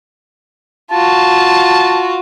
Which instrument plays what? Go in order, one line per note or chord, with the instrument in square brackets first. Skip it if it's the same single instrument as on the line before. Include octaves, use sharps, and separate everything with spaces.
[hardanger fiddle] F4 F#4 [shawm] A5